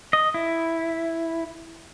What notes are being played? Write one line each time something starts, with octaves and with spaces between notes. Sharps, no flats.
D#5
E4